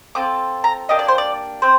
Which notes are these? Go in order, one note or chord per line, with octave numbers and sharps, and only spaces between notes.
C4 F4 A4 D6
A#5
A#3 D4 G4 D#5
D5
C5
D5
C4 C5